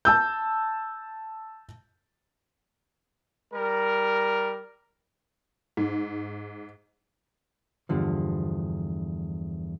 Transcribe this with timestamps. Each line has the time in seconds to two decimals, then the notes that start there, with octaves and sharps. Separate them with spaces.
0.05 A5 E6 G6
3.53 G3 A#4
5.77 G#2
7.89 E2 G2 D3 F3